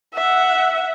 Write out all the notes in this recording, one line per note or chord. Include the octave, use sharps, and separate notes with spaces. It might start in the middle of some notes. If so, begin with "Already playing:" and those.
E5 F#5